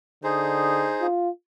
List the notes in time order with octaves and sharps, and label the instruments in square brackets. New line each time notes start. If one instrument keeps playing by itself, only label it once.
[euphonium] D3 [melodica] D#4 G#4 C5
[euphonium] F4